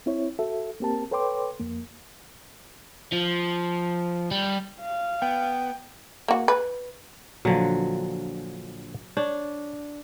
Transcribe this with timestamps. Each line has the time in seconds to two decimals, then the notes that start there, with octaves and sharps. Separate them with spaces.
0.06 C4 E4 C#5
0.39 F#4 A4 E5
0.80 A#3 C4 G4 A#4 A5
1.11 A4 B4 C#5 G5 C6 D6
1.60 F2 A#3
3.13 F3
4.31 G3
4.81 F5
5.22 B3 G5
6.28 A#3 F#4
6.48 B4
7.45 A#1 D3 F3 F#3
9.17 D4 C#5